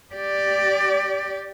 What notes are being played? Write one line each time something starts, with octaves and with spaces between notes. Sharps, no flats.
G4 D5